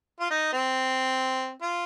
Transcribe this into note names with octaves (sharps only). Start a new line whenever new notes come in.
F4
D#4
C4
F4